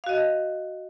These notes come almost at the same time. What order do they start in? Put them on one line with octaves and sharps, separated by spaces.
F5 F#4 D#5